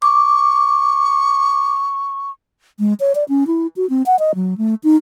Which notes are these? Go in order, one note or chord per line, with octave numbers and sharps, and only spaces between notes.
C#6 D6
G#3
C#5
D5
C#4
E4
F#4
C4
F#5
D#5
F#3
A3
D#4